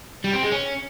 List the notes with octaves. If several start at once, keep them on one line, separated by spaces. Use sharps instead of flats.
G3
C4
G#3
C#4